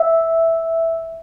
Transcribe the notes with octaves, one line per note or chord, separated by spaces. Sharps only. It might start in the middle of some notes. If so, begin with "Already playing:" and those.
Already playing: E5